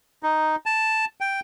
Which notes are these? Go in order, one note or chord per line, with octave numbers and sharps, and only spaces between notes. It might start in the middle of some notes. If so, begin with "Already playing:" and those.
D#4
A5
G5